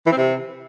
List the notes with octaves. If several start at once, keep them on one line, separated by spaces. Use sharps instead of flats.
E3
C4
C3